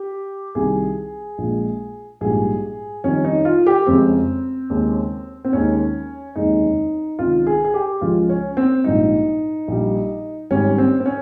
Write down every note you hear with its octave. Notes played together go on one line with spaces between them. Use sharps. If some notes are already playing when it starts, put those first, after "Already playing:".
Already playing: G4
C2 C3 D#3 G3 G#4
A#1 A#2 G#3
A#1 G#2 G3 G#4
F2 D#3 G3 C#4
D#4
F4
G4
F1 F2 C#3 G#3 C4
D#2 C#3 G#3
C4
D#2 D#3 G#3 C#4
F1 D#2 C#3 G#3 D#4
C#2 C3 D#3 F4
G#4
G#4
G4
C#2 C#3 F3 G#3 F4
C#4
C4
A#1 G#2 G3 D#4
A#1 A#2 G3
G#1 G#2 G3 C#4
C4
C4
C#4